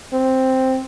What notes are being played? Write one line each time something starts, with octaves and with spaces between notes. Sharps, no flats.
C4